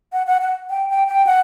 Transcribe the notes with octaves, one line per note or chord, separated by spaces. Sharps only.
F#5
F#5
F#5
G5
G5
G5
F#5